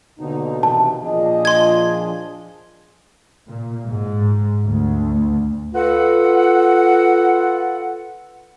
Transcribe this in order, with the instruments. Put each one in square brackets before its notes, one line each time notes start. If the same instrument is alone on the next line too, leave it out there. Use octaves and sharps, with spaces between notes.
[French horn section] D#2 B2 [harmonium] D3 D#4
[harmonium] C3 E3 [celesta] A5
[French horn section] A#2 D#5 [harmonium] F3 D4 G#4
[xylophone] C6 G#6
[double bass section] A#2
G#2
D2
[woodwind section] F4 A4 B4 F#5